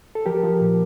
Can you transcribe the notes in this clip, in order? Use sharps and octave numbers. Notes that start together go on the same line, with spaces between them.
A4
F3 G4 A#4
F3
A#2